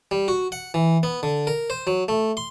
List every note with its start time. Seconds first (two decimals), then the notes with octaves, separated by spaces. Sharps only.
0.11 G3
0.28 F#4
0.52 F#5
0.74 E3
1.03 B3
1.23 D3
1.47 A#4
1.70 C5
1.87 F#3
2.08 A3
2.37 C6